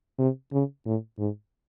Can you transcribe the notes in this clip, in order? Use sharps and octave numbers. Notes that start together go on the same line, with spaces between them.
C3
C#3
A2
G#2